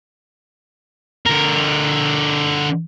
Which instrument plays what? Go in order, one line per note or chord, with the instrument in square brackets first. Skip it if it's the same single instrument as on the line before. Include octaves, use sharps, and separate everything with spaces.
[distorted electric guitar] D3 A#4